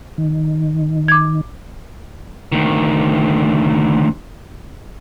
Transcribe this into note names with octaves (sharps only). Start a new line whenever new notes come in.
D#3
D6 G#6
D2 D#3